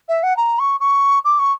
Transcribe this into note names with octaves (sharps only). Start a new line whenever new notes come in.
E5
F#5
A#5
C#6
C#6
D6
C#6